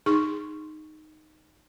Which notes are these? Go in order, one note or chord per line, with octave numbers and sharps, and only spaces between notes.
D#4 G#4 C6 C#6